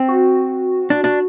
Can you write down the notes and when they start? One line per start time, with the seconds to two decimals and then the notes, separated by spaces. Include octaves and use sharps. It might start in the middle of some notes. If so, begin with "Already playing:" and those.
Already playing: C4
0.08 F#4
0.90 D4
1.04 D4